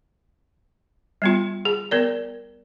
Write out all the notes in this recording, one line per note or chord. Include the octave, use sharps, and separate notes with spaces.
G3 B3 F4
G#4
B3 A#4 D5